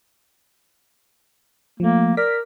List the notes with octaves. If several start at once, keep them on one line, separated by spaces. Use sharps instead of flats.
F3 A3 A#3
A#4 D5 D6 B6